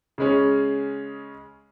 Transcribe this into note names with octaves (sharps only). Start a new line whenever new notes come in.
C#3 G#3 C#4